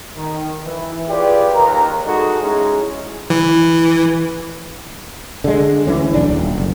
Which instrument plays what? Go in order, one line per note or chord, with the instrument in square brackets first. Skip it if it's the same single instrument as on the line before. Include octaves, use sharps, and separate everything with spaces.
[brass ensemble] D#3
E3
F4 G4 G#4 B4 C#5 D5
D#2 A#4 A#5
G#3 D#4 F#4 A4
G#3 C#4 D#4 E4 G#4
[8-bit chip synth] E3
[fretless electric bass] D3 G#3
D2 E3 C#4
D#1 B1 D4
D#1
F#1